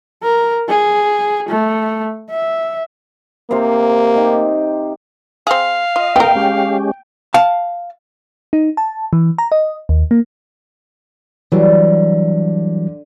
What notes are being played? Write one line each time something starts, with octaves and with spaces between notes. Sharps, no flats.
A#4
G#4
A3
E5
C3 A#3 C5 F5
D#4 G4
C4 G#4 F5
F4 D#5
B3 A#4 G5
G#3 C#4 G4
F5 A5
D#4
A5
E3
A#5
D#5
D#2
A#3
D3 E3 F#3 G3